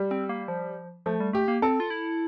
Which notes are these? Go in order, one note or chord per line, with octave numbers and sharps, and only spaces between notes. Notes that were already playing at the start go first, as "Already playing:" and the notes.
Already playing: G3
C4
A#3
F3
F3 A3
G3
A3 G4
A#3
C4 A4
F4
E4